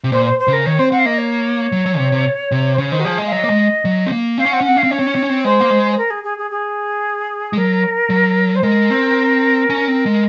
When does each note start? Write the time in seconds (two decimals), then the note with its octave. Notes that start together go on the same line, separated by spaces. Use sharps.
0.04 C3
0.12 A#2 C5
0.25 C5
0.39 C5
0.47 C#3
0.53 A#4
0.66 D#3 C#5
0.79 C4 C5
0.92 C4 F#5
0.99 F5
1.06 A#3 D#5
1.18 C#5
1.72 F#3
1.86 F#3
1.98 C3
2.12 C3
2.51 C3
2.74 C5
2.78 C#3 C#5
2.92 D#3 C5
2.99 F#4
3.05 F3 G#4
3.18 G#3
3.26 F5
3.32 F#3 D#5
3.44 A#3
3.50 G#3
3.85 F#3
4.06 C4
4.12 A#3
4.38 C4 F5
4.45 C#4
4.51 C4 F#5
4.61 C#4
4.65 C4 F#5
4.76 C#4 F5
4.83 C4
4.91 C#4 C#5
4.99 C4
5.07 C#4
5.15 C4
5.22 C#4
5.29 C4
5.44 G#3 C5
5.60 A#3
5.70 G#3
5.91 C5
5.98 A#4
6.10 G#4
6.24 G#4
6.38 G#4
6.51 G#4
7.53 G#3
7.57 F#3 A#4
8.10 F#3
8.56 C5
8.63 G#3 A#4
8.90 C4
9.70 C#4
9.88 C4
10.06 G#3